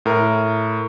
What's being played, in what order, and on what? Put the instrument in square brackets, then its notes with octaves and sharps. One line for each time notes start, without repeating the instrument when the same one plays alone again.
[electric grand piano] A2 A#4